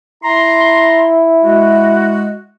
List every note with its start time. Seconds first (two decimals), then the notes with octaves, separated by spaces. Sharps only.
0.24 E4 A#5 C6
1.43 G#3 F#4